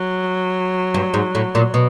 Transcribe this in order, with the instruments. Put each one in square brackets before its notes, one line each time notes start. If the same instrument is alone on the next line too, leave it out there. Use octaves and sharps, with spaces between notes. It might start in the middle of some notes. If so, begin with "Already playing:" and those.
Already playing: [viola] F#3
[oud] G2
G#2
A2
A#2
B2